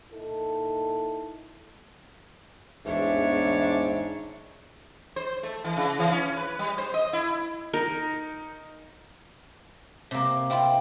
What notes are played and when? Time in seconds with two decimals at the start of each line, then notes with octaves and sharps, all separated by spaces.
0.12 A#2 D#4 E4 A4
2.86 A1 E2 G#2 D4 C#5 E5
5.16 C5
5.43 A3
5.64 E3
5.77 C#3
5.99 E3
6.12 C#4
6.37 B4
6.59 G3
6.78 C5
6.94 D#5
7.13 E4
7.74 D#4 A#4
10.11 C3 A#3
10.50 C4 E4 F4